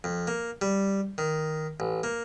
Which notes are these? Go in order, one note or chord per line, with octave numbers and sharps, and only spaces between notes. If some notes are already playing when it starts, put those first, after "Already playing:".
F2
A#3
G3
D#3
A1
A#3